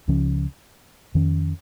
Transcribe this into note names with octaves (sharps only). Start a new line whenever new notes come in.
C#2 C#3 F3 C#4
F2 D#3 C#4